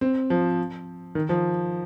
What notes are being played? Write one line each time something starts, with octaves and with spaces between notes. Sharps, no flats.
C4
F3
D#3
F3